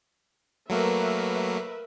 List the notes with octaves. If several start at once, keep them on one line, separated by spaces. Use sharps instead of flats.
F#3 A3 A#3 A#4 B4 E5